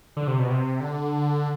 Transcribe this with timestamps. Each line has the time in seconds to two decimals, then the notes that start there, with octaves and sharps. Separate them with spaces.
0.17 D3
0.27 C3
0.39 B2
0.50 C3
0.80 D3